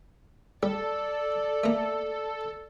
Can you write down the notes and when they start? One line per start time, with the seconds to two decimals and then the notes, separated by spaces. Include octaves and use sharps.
0.63 G3 A4 D5
1.64 A3 A#3